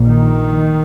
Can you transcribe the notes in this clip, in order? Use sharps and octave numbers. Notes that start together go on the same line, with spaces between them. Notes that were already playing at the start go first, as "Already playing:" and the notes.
Already playing: A#1 A#2
D#3